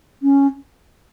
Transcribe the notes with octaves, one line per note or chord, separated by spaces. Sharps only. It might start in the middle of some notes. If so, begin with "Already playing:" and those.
C#4